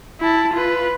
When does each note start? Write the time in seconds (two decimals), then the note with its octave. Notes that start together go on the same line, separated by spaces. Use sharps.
0.21 E4 A5
0.53 F4 B4